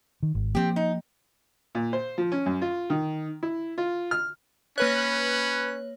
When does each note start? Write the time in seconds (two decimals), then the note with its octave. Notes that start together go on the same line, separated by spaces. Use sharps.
0.23 D#3
0.35 G#1
0.55 F3 A#3 C4 G4
0.76 D#4
1.75 A#2
1.93 C5
2.18 F3
2.32 C#4
2.46 F#2
2.62 F4
2.90 D#3
3.43 E4
3.78 F4
4.11 F6
4.78 A#3 C#4 B4 C#5 F#6